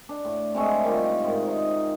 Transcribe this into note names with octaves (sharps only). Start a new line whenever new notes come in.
D4
A2
C3 G#3 A3
D#3 G3 F4
G#2 D#3
D#4